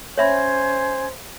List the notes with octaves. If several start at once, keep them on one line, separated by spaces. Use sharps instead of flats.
C#4 C5 C#5 E5 G#5 B5 G#6